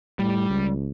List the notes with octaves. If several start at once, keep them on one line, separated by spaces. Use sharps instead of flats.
A2 G3
C#2